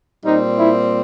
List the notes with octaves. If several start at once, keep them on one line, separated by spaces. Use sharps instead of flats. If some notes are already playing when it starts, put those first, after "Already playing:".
A#2 G3 C4 D#4
E4